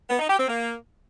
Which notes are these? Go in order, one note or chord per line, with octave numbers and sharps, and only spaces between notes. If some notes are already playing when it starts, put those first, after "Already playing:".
B3
D#4
G4
C4
A#3